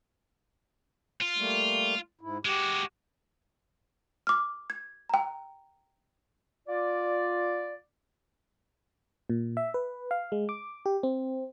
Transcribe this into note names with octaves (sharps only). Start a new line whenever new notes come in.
F4
G3 A3 A#3
G#2 E4
G#3 F#4 G4
D6 F6
G#6
G5 A#5
F4 D5
A#2
E5
B4
F5
G#3
D6
G4
C4